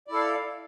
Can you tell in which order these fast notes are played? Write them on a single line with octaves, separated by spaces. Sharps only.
D5 E4 A4 F5